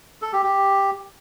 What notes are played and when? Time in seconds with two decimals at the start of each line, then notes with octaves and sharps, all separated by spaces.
0.22 A4
0.33 G4
0.44 G4